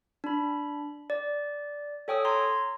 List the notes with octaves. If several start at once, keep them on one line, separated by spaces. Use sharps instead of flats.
D4 B5
D5
A4 C#5 G5 G#5 D#6 E6
A#5 C6 G#6